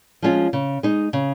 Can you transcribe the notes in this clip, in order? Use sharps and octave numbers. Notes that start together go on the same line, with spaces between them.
F3 G#3 C#4 F4
C#3
G#3 D#4
C#3